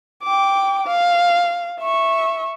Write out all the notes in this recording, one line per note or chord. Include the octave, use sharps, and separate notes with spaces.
G5 D6
F5
E5 C#6